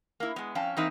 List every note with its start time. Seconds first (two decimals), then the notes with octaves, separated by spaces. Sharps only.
0.20 A#3 E4
0.36 G#3 B3
0.55 F2 C#4 F5 G5 A5
0.77 E3 A#3 C4 D#4 D#5 E5